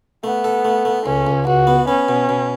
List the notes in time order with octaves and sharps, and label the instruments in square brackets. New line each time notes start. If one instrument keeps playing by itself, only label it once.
[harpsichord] A3 [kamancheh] B3
[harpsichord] A4
A3
A3
[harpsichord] C#2 [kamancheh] C#4
[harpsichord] C#2
[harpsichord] C#2 [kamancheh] F#4
[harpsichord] B3
[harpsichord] B3 [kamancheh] C#4
[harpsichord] B2
B2